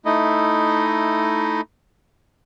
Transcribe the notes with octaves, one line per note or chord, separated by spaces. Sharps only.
A3 D#4 E4 D#5